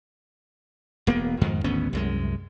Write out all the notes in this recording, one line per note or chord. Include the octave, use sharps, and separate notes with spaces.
E1 A#3 B3
F2 G#2 D#3
G#1 D2 B3 C#4
C2 F#2 G#3